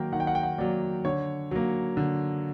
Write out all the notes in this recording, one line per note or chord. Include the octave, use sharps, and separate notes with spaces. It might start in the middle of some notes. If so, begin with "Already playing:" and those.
Already playing: D#3 F#3 A#3 G5
D#3 F#5
G5
F#5
G5
F#5
F#3 A#3 D5
D3 C#5
F#3 A#3
D3